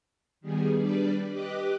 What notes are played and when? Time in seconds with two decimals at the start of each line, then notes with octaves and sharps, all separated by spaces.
0.41 D#3 G3 B3 G#4
0.76 G3 D4 B4 D5
1.27 G4 B4 D#5 D6 F#6